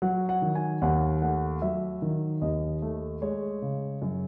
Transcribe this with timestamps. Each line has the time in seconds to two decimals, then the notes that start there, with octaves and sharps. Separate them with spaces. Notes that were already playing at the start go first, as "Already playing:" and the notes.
0.02 F#3 F#5
0.29 F#5
0.42 D#3
0.55 G#5
0.82 D#2 F#5
1.22 A3 F#5
1.62 F#3 E5
2.02 D#3
2.42 D#2 D#5
2.82 A3
3.22 G#3 C#5
3.62 C#3
4.02 F#2